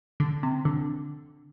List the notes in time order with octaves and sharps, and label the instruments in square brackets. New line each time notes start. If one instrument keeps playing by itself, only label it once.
[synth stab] D3
C3
D3